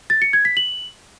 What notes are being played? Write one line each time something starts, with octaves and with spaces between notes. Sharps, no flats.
A6
C#7
G#6
B6
F#7